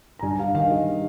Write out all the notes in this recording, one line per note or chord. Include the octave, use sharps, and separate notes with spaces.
A#5
G2 G#5
G2 F5
D#3 F5
G3 D#5